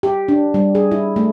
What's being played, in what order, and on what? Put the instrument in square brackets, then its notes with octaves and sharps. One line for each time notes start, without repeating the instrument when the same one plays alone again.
[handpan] G4
D4
G3
G#4
E4
A3